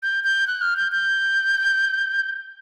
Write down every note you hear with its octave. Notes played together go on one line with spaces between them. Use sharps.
G6
G6
F#6
F6
G6
G6